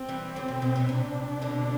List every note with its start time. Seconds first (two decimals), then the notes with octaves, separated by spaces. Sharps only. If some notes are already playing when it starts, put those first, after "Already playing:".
Already playing: C4
0.09 E3 G3
0.36 D3 F#3
0.48 B2
0.62 B2
0.76 B2
0.89 C3 D4
1.42 B2 D3